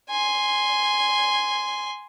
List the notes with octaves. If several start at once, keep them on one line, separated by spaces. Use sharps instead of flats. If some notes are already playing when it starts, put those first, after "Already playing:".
G#5 C6